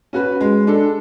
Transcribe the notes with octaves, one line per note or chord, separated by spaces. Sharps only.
C#4 F#4 B4
G#3
D4 A4